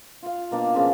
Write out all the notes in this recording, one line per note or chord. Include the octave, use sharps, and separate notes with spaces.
F4 F5
B2 A#3 D4
C#3 F3 F4 B4